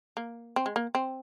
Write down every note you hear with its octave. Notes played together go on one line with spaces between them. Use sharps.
A#3
C4
G#3
A#3
C4